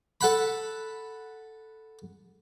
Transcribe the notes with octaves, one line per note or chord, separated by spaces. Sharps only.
A4 F#5 B5